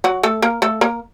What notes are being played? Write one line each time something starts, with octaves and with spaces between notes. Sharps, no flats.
F#3 F#4
A3 A4
A#3 A#4
A3 A4
A#3 A#4